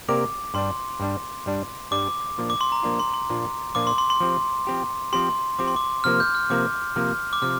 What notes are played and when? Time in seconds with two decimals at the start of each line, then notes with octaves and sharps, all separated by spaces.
0.08 C3 A#3 G4 A#4 D5 D6
0.54 G2 G3 D4 C6
1.00 G2 G3 D4
1.46 G2 G3 D4
1.91 G2 G3 D4 D6
2.38 A#2 F3 A#3 D4 F4
2.50 D6
2.61 C6
2.72 A#5
2.83 A#2 F3 A#3 D4 F4
2.99 C6
3.14 C6
3.30 A#2 F3 A#3 D4 F4
3.75 A#2 F3 A#3 D4 F4 D6
3.87 C6
3.98 C6
4.10 C6
4.20 F3 C4 G4
4.67 F3 C4 G4
5.13 F3 C4 G4 C6
5.59 F3 C4 G4 D6
5.68 C6
5.76 D6
6.04 C3 F3 A#3 F6
6.20 G6
6.35 F6
6.50 C3 F3 A#3 D6
6.96 C3 F3 A#3 F6
7.33 D6
7.42 C3 F3 F6